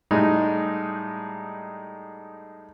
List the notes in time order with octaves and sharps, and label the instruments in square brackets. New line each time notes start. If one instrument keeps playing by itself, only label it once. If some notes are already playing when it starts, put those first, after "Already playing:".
[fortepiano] A2 G3 G#3 D#4